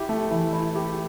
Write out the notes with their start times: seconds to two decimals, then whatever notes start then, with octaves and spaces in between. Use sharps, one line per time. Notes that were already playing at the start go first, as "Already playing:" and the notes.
Already playing: E4 G4
0.09 A3
0.31 E3
0.53 E4
0.75 G4